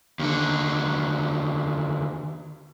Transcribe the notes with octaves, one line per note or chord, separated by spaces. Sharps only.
D#2 D3